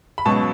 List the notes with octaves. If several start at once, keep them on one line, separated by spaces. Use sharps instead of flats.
B5
C#2 B2 F#3 B3 A5 C#6